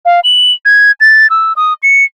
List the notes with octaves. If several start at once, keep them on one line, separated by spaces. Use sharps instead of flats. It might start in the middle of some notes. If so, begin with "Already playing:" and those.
F5
F#7
G#6
A6
E6
D#6
C#7